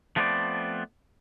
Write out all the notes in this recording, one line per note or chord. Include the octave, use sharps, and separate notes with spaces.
F3 A3 B3 C4 C#5 D5